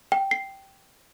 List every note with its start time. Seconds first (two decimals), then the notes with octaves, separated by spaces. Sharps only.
0.12 G5
0.31 C7